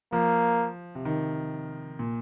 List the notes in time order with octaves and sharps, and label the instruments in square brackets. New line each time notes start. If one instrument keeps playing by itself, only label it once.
[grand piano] F3 [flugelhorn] A#3
[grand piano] C3
D#3
A#2